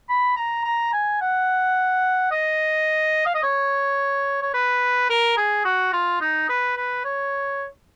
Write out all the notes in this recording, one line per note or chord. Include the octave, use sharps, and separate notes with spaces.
B5
A#5
A#5
G#5
F#5
D#5
F5
D#5
C#5
C#5
B4
A#4
G#4
F#4
F4
D#4
B4
B4
C#5